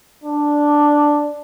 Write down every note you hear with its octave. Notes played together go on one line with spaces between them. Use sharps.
D4